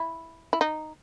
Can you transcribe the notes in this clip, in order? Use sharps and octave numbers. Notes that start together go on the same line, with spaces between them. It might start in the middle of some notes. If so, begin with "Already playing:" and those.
Already playing: E4
E4
D#4